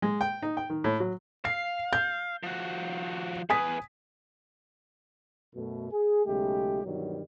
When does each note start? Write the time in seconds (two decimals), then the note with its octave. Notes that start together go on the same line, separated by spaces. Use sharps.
0.02 G#3
0.21 G5
0.43 D#4
0.57 G5
0.70 D#3
0.84 A2
1.00 F#3
1.45 F5 C7
1.93 G6
2.43 F3 F#4
3.50 E2 B4 G#5 D#6 B6
5.56 F#2 B2 A3
5.91 G#4
6.25 B1 C#3 G#3 A3 G4
6.84 G2 B2 D#3 E3 F#3 G3